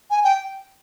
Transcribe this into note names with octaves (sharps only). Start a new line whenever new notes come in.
G#5
G5